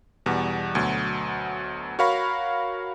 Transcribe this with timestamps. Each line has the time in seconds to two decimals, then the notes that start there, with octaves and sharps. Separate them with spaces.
0.26 E2 B2 G3 F#5
0.75 D2 B2 F#3
1.99 F#4 A#4 C#5 F5 B5 C#6